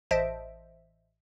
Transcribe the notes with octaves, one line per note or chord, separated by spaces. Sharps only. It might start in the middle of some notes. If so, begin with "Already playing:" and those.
A1 C5 D#5 E5 A5 D7